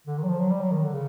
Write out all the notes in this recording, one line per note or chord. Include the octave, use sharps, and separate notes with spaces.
D3
D#3
F#3
F3
F#3
G3
F#3
D#3
D3
C#3